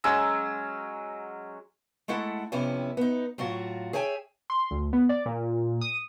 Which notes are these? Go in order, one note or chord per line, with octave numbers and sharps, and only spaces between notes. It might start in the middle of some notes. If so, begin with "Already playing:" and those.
F#3 G#3 C#4 E6
G#3 A3 E4 A4 F#5
F2 C3 B3 C#4 E4
B3 D#4
A2 F#3 F4 F#4
G#4 C#5 E5 G5 G#5
C6
D2
B3
D5
A#2
D#6